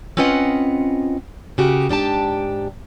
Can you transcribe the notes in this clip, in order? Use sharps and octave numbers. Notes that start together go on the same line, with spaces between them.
C4 C#4 F4 B4 D#5 F#5
C#3 A#3 F#4 G4
G#2 D4 G4 A5